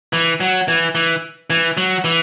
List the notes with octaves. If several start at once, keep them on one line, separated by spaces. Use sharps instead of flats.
E3
F#3
E3
E3
E3
F#3
E3